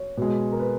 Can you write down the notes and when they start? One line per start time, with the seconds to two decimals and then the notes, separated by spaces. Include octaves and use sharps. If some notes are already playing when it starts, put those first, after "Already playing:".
Already playing: C#5
0.17 B2 G#3
0.52 A#4
0.60 B4